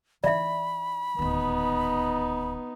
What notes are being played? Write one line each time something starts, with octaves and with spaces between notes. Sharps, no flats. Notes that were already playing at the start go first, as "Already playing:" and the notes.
E3 D#4 D5 E5 B5
D1 D#2 B3 D#4